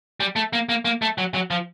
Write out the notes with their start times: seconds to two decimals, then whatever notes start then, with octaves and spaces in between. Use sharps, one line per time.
0.20 G3
0.36 A3
0.53 A#3
0.69 A#3
0.85 A#3
1.02 A3
1.18 F#3
1.34 F#3
1.51 F3